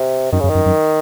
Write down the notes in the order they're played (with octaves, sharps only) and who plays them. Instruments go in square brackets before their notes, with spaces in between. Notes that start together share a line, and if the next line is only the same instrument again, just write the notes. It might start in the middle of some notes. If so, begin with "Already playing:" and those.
Already playing: [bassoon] C3
[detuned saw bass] F#2 [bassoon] D#3
[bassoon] C#3
[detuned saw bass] F#2
[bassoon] D#3
[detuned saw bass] F#2
F#2